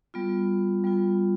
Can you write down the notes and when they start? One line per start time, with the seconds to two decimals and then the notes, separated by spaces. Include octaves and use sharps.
0.14 G3 B3 F4
0.84 G3 B3 F4